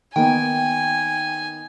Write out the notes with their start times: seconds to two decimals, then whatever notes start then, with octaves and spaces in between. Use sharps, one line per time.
0.16 D#3 A#3 B3 G5 G#5